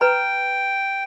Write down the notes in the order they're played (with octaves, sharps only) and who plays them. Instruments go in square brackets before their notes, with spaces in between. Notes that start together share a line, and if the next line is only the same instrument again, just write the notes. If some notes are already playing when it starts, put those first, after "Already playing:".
[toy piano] B4 A#5 B5 [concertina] G5